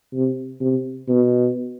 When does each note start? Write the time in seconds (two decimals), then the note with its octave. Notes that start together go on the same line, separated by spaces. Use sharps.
0.14 C3
0.61 C3
1.08 B2